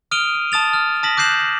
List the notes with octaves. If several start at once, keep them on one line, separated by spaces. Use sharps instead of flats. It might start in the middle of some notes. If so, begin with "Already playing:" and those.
D#6 F6 D7 D#7 F7 G7
A5 D#6 A6 F7
F6
A5 D#6 A#6 B6 F#7
D6 F#6 G6 C7 E7 F#7